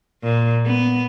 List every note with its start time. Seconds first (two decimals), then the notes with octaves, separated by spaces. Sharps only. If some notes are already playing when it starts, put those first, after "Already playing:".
0.23 A#2
0.66 B3